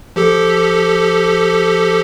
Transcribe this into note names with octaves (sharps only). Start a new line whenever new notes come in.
F3 G4 A4